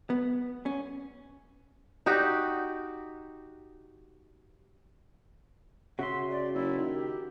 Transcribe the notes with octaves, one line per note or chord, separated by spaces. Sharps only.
B3
C#4
D#4 F#4 G4
C#3 F#4 E5 C6
D5
F#1 E4
D#3
G4